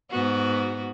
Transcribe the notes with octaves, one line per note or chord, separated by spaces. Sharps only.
G#2 B3 F#4